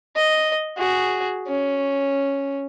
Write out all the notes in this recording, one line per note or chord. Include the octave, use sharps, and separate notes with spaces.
D#5
F#4 G#4
C#4